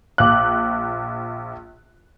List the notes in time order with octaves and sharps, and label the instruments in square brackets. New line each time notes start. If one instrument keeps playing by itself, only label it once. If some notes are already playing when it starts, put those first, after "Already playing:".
[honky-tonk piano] A#1 F#6 [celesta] F5 D6